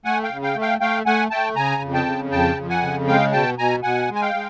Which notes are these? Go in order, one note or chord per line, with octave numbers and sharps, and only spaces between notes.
A3 F#5 G#5
F5 G5
C#3
F5 G5
A3
F5 G5
A3 F5 G5
A3 F#5 G#5
A3 G5 A5
C#3 G#5 A#5
F2
G5 A5
C#3
F2 G5 A5
F2
F#5 G#5
C#3
G#3 F5 G5
B2 G5 A5
B2 G#5 A#5
B2 F#5 G#5
G#3
G#5
F5 G5
G#3